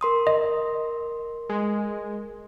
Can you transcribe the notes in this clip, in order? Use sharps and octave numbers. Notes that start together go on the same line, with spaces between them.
A#4 C6 D#6
D#5
G#3